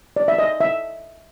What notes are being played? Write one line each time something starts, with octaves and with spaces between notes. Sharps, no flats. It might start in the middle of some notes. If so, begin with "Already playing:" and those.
D5
E5
D#5
E5